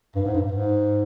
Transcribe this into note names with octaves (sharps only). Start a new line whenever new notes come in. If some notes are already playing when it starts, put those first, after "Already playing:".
G2
G#2
G2
G#2